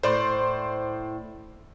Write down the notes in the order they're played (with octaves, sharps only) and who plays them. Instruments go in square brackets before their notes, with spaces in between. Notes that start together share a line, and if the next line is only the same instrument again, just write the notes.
[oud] A2 [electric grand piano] C5 D5 C6